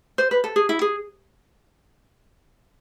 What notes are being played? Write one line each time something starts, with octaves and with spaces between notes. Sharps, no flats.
C5
B4
A4
G#4
E4
G#4